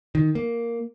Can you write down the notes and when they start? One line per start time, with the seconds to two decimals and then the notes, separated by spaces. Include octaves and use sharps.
0.15 D#3
0.35 A#3